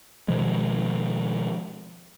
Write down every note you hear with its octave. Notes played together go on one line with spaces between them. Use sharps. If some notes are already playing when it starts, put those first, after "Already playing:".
B2 D#3 F3 G#3